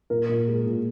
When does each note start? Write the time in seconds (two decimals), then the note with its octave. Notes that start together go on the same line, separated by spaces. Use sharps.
0.10 A#2 A#4
0.29 A#2
0.47 G#3
0.67 A#2